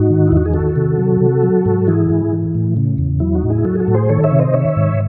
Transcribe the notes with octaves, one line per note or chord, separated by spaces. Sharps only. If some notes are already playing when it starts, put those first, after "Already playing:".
Already playing: G#2 D#4 F#4
D#3
E4
E2 F#4
G#4
D#3 F#4 A4
C3
F#3
C3
F#3
G#2
E3 E4 G#4
G#2
E3
A2
C#3
E2
F#3 E4
D#4 F#4
A2
E4 G#4
F#3 F#4 A4
G#4
F#4 A4
A2
G#4 C5
D#3 A4 C#5
C#5 E5
C3
C5 D#5
D#3 C#5 E5
G#2